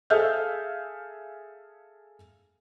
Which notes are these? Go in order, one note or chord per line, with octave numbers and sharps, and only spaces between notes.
G#4 A4 E5 F5 F6 G6